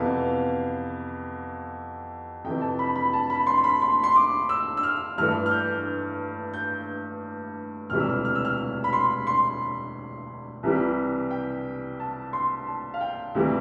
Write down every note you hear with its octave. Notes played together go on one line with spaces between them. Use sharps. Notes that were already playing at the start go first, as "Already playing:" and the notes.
Already playing: F2 C3 E3 B3 F5
F2 C3 E3 G5
A5
B5
B5
A5
B5
C6
C6
B5
C6
C6
D6
E6
E6
F6
G2 E3 A3 F6
F6
G6
G6
E1 D2 C3 E3 G3 F6
E6
F6
F6
E6
F6
B5
C6
C6
C2 C3 E3 G3
G5
A5
C6
A5
F5
G5
D2 C3 E3 G3